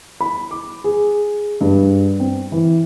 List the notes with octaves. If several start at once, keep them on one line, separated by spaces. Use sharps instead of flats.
B5
D6
G#4
G2
C4
E3